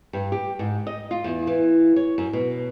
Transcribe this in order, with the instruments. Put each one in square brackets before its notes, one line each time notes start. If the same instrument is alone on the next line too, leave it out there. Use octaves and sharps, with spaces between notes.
[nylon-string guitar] G2
G4
G#2
D#5
F4
E2
E3
C#5
F#2
B2